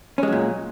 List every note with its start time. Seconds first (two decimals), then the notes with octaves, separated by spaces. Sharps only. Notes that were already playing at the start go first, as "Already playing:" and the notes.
0.18 C#4
0.23 G#3
0.28 F#3
0.32 A#2